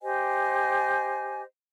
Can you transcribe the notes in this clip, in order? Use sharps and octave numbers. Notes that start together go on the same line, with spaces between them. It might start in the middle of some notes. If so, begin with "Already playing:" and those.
G4 C5 D#5 G#5